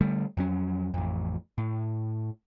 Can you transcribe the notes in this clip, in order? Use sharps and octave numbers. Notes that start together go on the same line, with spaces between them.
D3 G3 A3
F2 F#3 C#4
A1 F2
A2